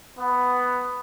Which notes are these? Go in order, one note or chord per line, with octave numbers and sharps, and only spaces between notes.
B3